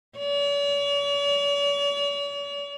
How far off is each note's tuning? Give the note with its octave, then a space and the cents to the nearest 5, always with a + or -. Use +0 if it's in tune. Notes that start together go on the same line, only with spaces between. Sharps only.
C#5 +45